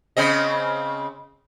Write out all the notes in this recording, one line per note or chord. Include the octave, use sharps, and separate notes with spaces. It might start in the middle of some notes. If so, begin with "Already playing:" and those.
C#3 C4 D#5